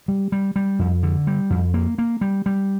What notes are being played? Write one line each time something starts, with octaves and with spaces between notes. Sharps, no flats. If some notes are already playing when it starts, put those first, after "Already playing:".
G3
G3
G3
F2
D3
G3
F2
A#3
A#3
G3
G3